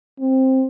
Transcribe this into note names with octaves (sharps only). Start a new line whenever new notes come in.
C4